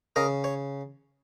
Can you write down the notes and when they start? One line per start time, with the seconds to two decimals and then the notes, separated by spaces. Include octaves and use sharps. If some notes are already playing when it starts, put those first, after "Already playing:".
0.16 C#3 A#4 D#5
0.44 C#5